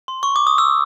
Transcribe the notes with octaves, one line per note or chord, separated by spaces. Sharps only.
C6
C#6
D6
D#6
E6